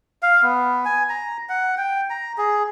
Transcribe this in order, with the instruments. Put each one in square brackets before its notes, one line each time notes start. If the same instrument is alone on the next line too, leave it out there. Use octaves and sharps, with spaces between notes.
[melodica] F5
B3
G#5
A#5
F#5
G5
A#5
G#4